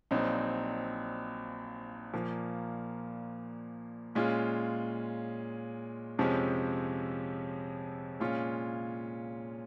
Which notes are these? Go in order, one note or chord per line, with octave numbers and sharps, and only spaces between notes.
A#1 A#2 F#3 C4 D#4
A#2 F3 A#3
A#2 G#3 C#4 F4
F2 C3 F3 G#3 C#4
A#2 G#3 C#4 F4